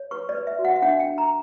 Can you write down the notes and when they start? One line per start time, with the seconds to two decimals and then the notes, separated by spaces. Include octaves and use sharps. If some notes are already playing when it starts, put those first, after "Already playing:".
Already playing: C#5
0.11 B4 C#6
0.29 D5
0.35 B4
0.47 E5
0.59 F#4
0.65 F#5
0.76 E5
0.82 D4 F#5
1.00 G5
1.06 D4
1.18 A#5